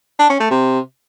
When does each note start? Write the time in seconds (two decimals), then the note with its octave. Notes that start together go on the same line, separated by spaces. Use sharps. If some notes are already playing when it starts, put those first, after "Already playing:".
0.19 D4
0.30 C#4
0.40 A3
0.51 C3